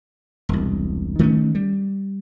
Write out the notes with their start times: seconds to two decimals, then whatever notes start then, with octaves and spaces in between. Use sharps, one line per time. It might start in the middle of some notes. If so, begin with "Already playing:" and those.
0.49 E1 C2
1.19 D#3 A3 A#3 C#4
1.55 G3